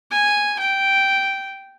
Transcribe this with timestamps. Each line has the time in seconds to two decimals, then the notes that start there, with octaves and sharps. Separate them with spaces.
0.11 G#5
0.59 G5